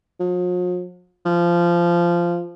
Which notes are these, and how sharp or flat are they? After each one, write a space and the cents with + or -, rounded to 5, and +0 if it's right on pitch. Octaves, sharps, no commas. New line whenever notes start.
F3 +45
F3 -15